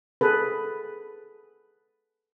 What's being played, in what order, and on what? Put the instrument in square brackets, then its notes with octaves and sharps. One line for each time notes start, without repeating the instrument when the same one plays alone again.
[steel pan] G#4 A4 B4